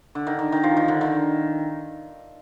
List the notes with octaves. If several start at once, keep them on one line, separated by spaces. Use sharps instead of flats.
D3
D#3
D#3
D#3
F3
D#3
D3
D#3